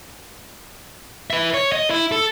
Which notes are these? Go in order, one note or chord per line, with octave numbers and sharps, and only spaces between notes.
B4 E5
C#5
D#5
E4
A4